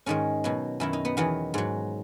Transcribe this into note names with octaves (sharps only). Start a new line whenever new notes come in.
G#2 D#3 G#3 C#4
B2 F#3
F#2 D#3 F#3 E4
D#4
B3
E2 D#3 F#3 B3
G#2 F#3